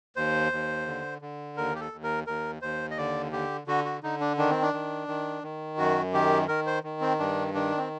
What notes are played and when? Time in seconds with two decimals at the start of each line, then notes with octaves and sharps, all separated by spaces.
0.16 D#2 C5
0.52 D#2
0.87 D3
1.22 D3
1.57 D#2 A#4
1.75 G4
1.80 A4
1.92 D#2
2.03 A#4
2.27 D#2 A#4
2.62 D#2 C5
2.91 D#5
2.97 D3 D5
3.32 D3 G4
3.67 D3 F#4
3.85 F#4
4.03 D3 D#4
4.21 D4
4.38 D#3 D4
4.51 C4
4.62 D4
4.73 D#3
5.08 D#3
5.43 D#3
5.78 F#2 F#4
6.13 D#3 G4
6.48 D#3 A#4
6.66 C5
6.83 D#3
7.01 C4
7.19 G2 D4
7.54 D#3 D4
7.78 C4